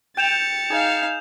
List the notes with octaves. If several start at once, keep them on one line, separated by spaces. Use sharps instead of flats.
G5 G6 A6 C#7 E7 F7
D#4 G#4 F5